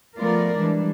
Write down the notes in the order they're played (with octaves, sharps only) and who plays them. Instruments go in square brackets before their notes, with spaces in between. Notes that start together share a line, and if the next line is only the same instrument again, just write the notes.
[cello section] F3 A3 B3 F4 A#4 D5
E3 G3 G#3 D4